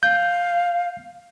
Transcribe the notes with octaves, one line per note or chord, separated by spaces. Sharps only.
F5 G6